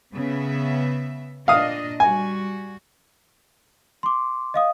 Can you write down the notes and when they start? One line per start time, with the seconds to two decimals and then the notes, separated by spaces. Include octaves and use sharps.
0.13 C#3 B3 E5
1.48 A#2 D4 D#5 F5 D#6
2.00 G3 F#4 G#5
4.03 C6 D6
4.54 D#5 F5 D#6